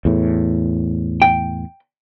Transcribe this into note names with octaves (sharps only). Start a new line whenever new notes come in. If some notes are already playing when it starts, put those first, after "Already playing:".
E2 A2
G5